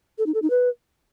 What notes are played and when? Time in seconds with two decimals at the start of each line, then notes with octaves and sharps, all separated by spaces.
0.18 A4
0.26 D#4
0.34 A4
0.42 D#4
0.50 B4